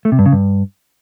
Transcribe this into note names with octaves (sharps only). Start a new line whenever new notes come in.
A3
C3
G2
C#3
G2